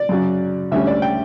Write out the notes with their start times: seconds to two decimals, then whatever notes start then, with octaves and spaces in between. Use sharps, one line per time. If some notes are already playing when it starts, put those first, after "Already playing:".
Already playing: D5
0.09 F#2 C#3 F#3 C#4
0.71 D2 D3 G3 C#4 E5
0.87 D5
1.02 G5